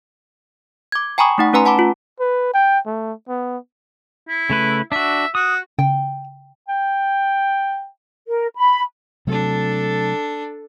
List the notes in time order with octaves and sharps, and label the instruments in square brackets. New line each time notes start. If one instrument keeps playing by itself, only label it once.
[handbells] D6 G#6
G5 G#5 A#5 B5 C#6 D#6
A3 D#4 F#5
A3 C#4 B4 G#5 A#5 C6
F#5 A5 B5 D6
F4
[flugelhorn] B4
G5
A3
B3
[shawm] E4
[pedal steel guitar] C#3 A3 B4
[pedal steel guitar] D4 F#4 [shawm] E5
[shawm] F#4 [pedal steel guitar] D#6
[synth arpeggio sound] C#3 [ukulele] G5
[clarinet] G5
[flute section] A#4
B5
[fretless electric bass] C3 F#3 A3 [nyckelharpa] D4 A4